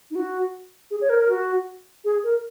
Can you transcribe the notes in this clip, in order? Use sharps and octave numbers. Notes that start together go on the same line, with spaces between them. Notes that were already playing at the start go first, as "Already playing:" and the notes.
D#4
F#4
G#4
C#5
A#4
A#4
F#4
G#4
A#4